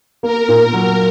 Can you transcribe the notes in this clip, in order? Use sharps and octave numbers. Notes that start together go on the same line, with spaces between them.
A#3 A#4
A#2
F#3